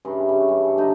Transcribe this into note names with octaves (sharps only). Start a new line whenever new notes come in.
G2 C#3 E3
C#3 C#4
G2
A4
D3 A#3 D#4